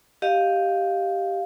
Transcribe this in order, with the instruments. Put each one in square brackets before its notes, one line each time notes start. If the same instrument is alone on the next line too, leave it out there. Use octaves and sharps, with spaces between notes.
[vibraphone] G4 D#5 F5